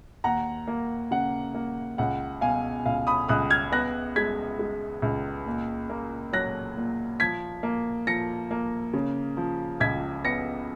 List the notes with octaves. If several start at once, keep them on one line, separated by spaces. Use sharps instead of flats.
D#2 F#5 A#5
A#3
C#3 F#5
A#3
C#2 F#5
B2 F5 G#5
C#2 F5
B5 D#6
C#2 D#6 F#6
F6 G#6
B3 F#6 A#6
G#3 G#6 B6
G#3
C#2
A#2
A#3
F#3 F#6 A#6
A#2
F3 G#6 B6
A#3
F3 A#6 C#7
A#3
C#3
F3
C#2 G#6 B6
B3 A#6 C#7